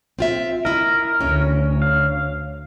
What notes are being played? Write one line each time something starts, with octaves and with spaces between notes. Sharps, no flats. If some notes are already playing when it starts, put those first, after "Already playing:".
C4 F4 E5
E4 A#4 D#5
D2 C#4 C#5
F5